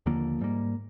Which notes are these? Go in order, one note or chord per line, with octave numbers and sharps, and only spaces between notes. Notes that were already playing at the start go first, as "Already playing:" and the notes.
D#2 D3 F3 A#3
G#2 G3 A#3